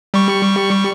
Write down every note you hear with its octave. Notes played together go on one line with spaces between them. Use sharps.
G3 C#6